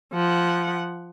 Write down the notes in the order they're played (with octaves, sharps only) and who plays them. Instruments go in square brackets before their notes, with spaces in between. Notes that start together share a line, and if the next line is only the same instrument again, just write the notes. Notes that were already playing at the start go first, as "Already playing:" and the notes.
[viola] F3 F#5